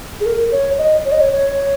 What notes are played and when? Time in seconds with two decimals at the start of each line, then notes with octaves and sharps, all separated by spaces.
0.21 G#4
0.26 A#4
0.52 C#5
0.78 D#5
1.05 C#5
1.12 D#5
1.21 C#5
1.32 C#5